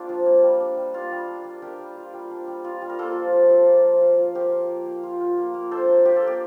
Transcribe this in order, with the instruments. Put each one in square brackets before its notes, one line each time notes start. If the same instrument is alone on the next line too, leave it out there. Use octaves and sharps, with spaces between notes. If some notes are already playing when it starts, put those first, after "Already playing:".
Already playing: [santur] A#3 D4 F4 G4
F3
A#3
G3
D4
G3
A#3 F4
G3
D4
G3
D4 G4 A#4
G3
F4
G3
D4
G3
F4
G3
A#4
A#3 F4 A4
F3
F4
F3
A#3
F3
F4
F3
F4 G4 A#4
F4
A#3
A#3
F4
F4
A#3
A#3
D4 A4 C5
A#3
F4 G4
A4
A#3 G4